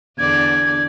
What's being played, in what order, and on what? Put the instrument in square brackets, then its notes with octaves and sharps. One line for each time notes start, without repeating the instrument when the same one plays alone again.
[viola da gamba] E2 D3 D5 [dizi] G#6